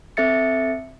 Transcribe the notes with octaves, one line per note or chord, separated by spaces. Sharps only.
C4 A4 E5 A6 C#7